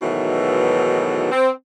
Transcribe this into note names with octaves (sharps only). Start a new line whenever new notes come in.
G#2 B2 D#3 E3 F#3 A3
C4